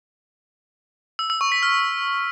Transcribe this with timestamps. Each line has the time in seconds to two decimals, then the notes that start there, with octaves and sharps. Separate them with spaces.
1.19 E6
1.30 E6
1.41 C#6
1.52 B6
1.63 F6